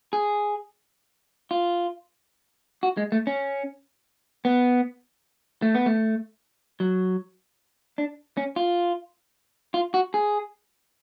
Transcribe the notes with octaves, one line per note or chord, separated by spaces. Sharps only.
G#4
F4
F#4
G#3
A3
C#4
B3
A3
B3
A3
F#3
D4
C#4
F4
F4
F#4
G#4